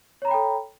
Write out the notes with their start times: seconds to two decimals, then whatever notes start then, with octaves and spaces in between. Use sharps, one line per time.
0.22 C#5
0.25 A#5
0.28 B5
0.31 G5
0.34 A4